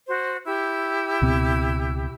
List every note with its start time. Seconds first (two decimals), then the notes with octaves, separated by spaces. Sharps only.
0.08 F#4 C5
0.45 E4 G4 E6
1.22 C#2 B2 C4